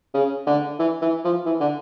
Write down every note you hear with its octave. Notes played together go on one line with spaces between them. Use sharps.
C#3
D3
E3
E3
F3
E3
D3